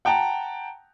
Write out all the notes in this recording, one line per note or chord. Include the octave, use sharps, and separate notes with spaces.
F#5 G5 A5 A#5